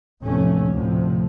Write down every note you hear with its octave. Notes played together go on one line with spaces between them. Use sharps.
F1 E2 A2 F3 A3 C#4
D2 A2 C3 F3